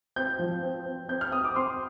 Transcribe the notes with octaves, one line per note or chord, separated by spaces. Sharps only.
C4 G6
F3
C4
C4
C4 G6
F6
C4 D#6
D6
C4 C6